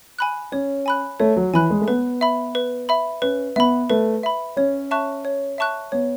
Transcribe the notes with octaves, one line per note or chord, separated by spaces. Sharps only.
G#5 B5 F#6
C#4 C#5
G#5 B5 F#6
A3 C#5
F#3
E3 G#5 B5 F#6
G#3
A3
B3 B4
E5 B5
B4
E5 B5
C#4 B4
B3 E5 B5
A3 B4
E5 B5
C#4 C#5
E5 A5 C#6 F#6
C#5
E5 A5 C#6 F#6
B3 C#5